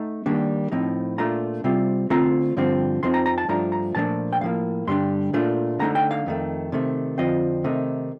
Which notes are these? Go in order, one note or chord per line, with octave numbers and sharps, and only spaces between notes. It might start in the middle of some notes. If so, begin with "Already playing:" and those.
Already playing: A3 D#4
D#3 G3 A#3 D4
A2 F3 C4 D#4
A#2 A3 D4 F4 A#5
C3 G3 C4 F4
D3 A3 C4 F4 A#5
G2 D3 F3 C4
F2 C3 F3 C4 D#4 C6
A#5
A#5
A5
G2 F3 A3 D4 A#5
A#5
A#2 F3 A3 D4 A5
G5
A2 F3 A#3 F5
G2 D3 G3 D4 C6
A#2 A3 D4 F4
D3 A3 D#4 A#5
G5
F5
F2 D#3 A3
C3 D#3 A3
F2 D3 F3 C4 F4 D#5
C3 D#3 A3 D#4